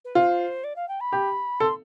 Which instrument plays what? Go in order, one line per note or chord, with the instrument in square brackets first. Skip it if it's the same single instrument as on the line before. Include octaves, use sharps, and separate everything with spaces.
[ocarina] B4
[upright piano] F4 [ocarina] C5
[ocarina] D5
F5
G5
B5
[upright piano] G4
[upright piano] A4 [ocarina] C6